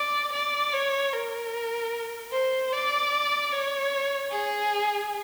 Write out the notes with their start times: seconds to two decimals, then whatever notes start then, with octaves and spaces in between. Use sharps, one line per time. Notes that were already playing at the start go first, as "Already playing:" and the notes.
Already playing: D5
0.33 D5
0.73 C#5
1.13 A#4
2.32 C5
2.72 D5
3.52 C#5
4.31 G#4